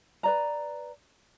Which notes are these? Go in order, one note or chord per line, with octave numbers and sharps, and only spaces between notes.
B4 D5 A#5